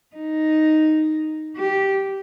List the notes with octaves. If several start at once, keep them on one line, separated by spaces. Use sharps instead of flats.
D#4
G4